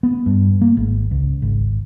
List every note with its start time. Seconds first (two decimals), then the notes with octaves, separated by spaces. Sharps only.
0.03 B3
0.26 G2
0.62 A#3
0.77 G#1
1.11 C#2
1.42 G#1